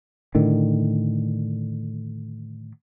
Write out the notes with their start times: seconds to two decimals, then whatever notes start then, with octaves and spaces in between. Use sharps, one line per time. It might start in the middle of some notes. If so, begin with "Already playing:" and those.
0.35 A2 D3 D#3